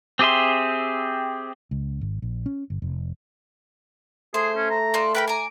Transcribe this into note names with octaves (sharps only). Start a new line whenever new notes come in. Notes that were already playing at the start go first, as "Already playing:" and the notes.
C4 G4 G#4 E5 C6
C#2
G#1
A#1
C#4
G1
F1
A3 G#4 C5
C#4
A#5
F4 A4 D5
A#4 B4 G5 B5
G#5 A#5 D6